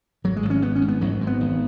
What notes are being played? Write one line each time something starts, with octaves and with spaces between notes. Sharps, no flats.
G#1 F#3
G#3
G#1
C#4
G#1 B3
C#4
G#2
B3
G#1 F#3
G#2
B3
G#1